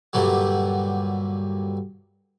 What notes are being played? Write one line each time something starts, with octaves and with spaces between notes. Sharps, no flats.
G2 A#2 D3 F#3